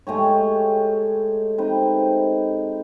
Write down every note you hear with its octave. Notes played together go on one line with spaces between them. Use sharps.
G#3 A3 G4 C#5
C4 D#4 B4